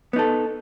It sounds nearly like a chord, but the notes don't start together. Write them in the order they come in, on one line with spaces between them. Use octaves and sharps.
B3 D#4 A4